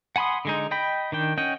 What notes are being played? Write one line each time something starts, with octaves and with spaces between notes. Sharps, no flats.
F#5 G#5 B5 C6 D#6
D3 G#3 D#4
D#5 G5 B5
D#3 D4 G5
C#4 D#5 F#5 G5